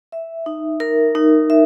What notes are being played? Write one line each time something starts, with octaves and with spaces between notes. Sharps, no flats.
E5
D#4
A#4
D#4
E5